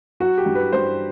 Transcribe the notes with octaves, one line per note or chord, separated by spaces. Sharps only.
F#3 F#4
G4
G2
B4
G2 C5